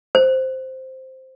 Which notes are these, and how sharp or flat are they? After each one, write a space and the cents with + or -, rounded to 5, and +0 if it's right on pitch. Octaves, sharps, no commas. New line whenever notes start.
C5 +0